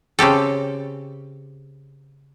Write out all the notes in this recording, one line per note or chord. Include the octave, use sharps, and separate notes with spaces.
C#3 C4 G4 A4